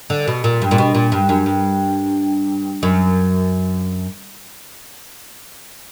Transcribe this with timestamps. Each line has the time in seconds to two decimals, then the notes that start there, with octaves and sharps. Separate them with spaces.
0.10 D3
0.27 B2
0.44 A#2
0.62 G2
0.71 A#2
0.78 B2
0.95 A#2
1.12 G2
1.29 F#2
1.46 G2
2.83 F#2